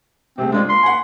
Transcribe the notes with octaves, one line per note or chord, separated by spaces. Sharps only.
C3 G#3 A3 C4
G#3 D4 F4 D5
A#3 C6
F#5 G#5